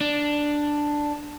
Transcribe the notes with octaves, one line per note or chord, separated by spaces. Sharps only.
D4